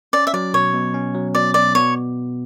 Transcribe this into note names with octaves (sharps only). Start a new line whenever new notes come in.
C#4 D5
E5
F#3 D5
B2 C#5
B2
C#4
F#3
B2 D5
B2 D5
B3 C#5